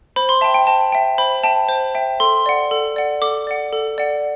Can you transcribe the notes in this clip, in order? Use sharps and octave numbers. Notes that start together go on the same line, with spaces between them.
C5 B5
C6
E5 G5 A5
G5
C5 A5
E5 G5
C5 B5
E5 G5 A5
C5
E5 G5
A4 C6
D5 F#5
A4
D5 F#5
A4 D6
D5 F#5
A4
D5 F#5